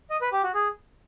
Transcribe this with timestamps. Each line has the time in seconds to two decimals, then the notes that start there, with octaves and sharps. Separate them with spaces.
0.10 D#5
0.21 B4
0.32 G4
0.43 F#4
0.54 G#4